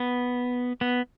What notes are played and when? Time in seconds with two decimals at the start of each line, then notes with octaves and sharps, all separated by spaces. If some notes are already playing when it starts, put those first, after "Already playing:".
Already playing: B3
0.81 B3